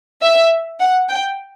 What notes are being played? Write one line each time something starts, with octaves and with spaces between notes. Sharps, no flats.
E5
F#5
G5